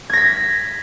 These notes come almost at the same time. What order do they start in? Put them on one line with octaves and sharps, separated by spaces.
G#6 A#6 B6